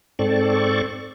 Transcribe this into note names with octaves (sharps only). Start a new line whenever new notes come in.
G#2 C4 A4 D5 C#6